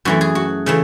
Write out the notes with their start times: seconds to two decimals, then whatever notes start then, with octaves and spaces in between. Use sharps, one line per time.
0.05 F#2 E3 A3 F#4
0.21 G#4
0.35 F#4
0.66 C#3 E3 A3